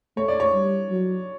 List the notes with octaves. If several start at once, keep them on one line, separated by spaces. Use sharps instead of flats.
A3 C#5
D5
C#5
G3
F#3